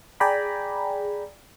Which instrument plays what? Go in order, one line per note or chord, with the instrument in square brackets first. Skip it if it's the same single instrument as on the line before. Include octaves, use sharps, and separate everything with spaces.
[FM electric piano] G#4 D5 G5 G#5 A#5 B5